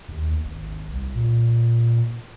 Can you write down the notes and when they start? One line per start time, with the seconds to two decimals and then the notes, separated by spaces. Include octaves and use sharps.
0.08 D#2
0.45 G#1
0.92 C2
1.15 A#2